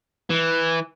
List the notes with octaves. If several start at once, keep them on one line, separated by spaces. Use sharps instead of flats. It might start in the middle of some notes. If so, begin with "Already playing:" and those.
E3